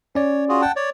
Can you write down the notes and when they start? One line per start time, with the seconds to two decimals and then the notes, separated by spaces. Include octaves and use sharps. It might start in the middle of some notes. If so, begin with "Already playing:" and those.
0.15 C#4 C#5 D5
0.49 F4 F#4 G#4
0.62 F#5 G5 A5
0.76 C#5 D5